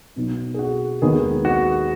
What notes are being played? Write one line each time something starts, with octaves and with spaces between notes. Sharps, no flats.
B2 F#3 B3 D#4
G#4
F#4
D#2 D#3 G#3 B3 G#4
F#4